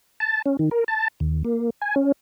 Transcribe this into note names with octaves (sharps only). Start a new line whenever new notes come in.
A5
C#4
D#3
A#4
A5
D#2
A#3
G#5
C#4